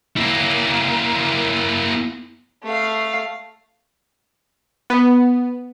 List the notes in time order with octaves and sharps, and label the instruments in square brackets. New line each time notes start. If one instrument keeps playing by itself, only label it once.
[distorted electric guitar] A#3 E4
[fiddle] A3 F5
[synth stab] B3